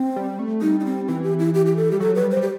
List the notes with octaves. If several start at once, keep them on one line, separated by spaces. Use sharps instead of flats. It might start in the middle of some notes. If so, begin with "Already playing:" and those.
Already playing: C4
G3
A3
G3 D#4
D#4
C4
E3 C4
G4
E4
G4
G4
A4
G3 G4
F#3 A4
F#3 B4
G3
C5
G3
G4